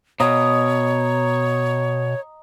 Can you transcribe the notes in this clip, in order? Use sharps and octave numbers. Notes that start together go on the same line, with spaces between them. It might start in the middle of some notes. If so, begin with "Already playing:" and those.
B2 C#5 D#5 A#5 D#6